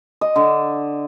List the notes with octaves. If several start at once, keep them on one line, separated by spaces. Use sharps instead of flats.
D#5
D3